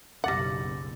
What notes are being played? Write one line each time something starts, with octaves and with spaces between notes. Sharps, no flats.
F#1 B1 G3 F#5 D6 A6 A#6